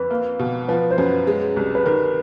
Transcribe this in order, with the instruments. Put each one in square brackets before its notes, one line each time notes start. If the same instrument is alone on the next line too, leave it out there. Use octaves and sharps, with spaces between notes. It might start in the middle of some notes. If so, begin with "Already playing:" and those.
Already playing: [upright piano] F2 [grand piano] B4
[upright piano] A#3
B2
[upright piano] F3 [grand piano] B4
[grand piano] C5
[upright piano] F#2 [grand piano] B4
[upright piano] G#3
C2
[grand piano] B4
[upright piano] D#3 [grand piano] A#4